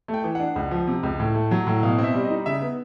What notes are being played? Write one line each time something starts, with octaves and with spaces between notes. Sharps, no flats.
A3
G5
E3
D4 F#5
C#2
F3
C3
C#2
A2
A3
F#3
A2
B2 F5
C4
E5
G3
D#5
D#4
C#3 E5
B3